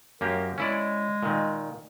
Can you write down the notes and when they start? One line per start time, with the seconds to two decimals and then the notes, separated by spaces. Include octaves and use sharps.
0.21 F#2 A#3 G4 A#4
0.58 G#3 C#4 E4 D5
1.23 A#2 D#3